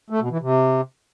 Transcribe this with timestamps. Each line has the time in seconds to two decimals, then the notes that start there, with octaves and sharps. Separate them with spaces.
0.10 A3
0.20 B2
0.31 E3
0.41 C3